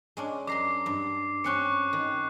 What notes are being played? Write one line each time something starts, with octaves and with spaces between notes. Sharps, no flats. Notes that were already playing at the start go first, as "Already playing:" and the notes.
G#3 C#4 D4
F#2 A#5 C6 D6 C7
G2
C4 C#4 G5 C#6 F#6 C#7
D#3